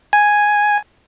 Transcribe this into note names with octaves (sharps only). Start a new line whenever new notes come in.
G#5